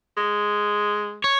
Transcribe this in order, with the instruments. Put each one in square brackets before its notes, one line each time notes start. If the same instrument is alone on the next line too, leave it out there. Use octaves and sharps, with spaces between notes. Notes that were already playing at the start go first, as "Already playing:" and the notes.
[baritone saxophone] G#3
[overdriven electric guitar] C#5